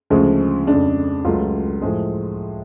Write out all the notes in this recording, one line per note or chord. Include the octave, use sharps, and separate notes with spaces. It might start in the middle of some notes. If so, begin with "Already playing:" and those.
D2 C#3 F3 G#3
F2 C#3 G#3 D4
C#2 C#3 F#3 A3 F4
A2 F3 G#3 G#4